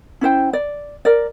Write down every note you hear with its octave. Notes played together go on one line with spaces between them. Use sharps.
C#4 E4 C5 G5
D5
A#4 D5